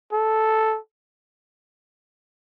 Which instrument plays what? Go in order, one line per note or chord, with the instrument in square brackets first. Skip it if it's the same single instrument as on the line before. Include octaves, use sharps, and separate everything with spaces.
[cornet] A4